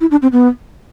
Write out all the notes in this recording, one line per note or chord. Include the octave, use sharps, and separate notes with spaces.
E4
D4
C4
B3